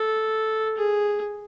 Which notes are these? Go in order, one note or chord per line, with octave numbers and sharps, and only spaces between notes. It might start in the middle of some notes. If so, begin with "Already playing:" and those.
Already playing: A4
G#4